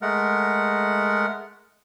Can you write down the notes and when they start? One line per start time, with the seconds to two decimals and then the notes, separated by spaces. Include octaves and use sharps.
0.02 G#3 A3 A#4 F#5